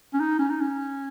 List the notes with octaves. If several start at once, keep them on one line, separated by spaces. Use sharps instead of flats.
C#4
D#4
C#4
D#4
C#4